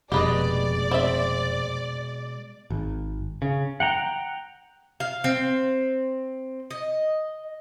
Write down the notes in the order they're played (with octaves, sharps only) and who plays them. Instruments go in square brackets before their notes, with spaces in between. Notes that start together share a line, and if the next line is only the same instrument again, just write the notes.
[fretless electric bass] F1 [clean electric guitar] B2 G#3 [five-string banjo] G4 B4 D#5 [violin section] D5
[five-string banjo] C4 E5
[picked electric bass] G#1
C#3
[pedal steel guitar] F#5 G5 A#5
[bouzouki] F5
C4
D#5